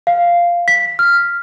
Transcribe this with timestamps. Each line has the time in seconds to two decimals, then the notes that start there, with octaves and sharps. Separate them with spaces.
0.07 F5
0.68 B6
0.99 F6